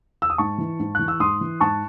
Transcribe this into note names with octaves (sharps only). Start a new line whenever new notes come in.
E6
D#6
G#2 A5 C#6
E3
G#2
E3 F#6
E6
G#2 C6 D#6
E3
G#2 A5 C#6